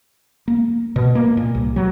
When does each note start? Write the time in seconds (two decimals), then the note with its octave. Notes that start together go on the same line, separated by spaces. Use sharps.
0.48 A#3
0.96 B2
1.15 A#3
1.37 A#2
1.55 C2
1.76 F#3